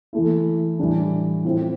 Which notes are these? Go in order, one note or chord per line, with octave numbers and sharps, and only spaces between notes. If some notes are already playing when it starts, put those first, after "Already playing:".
E3 A3 E4
A2 E3 G3 D4
A2 F3 C4 E4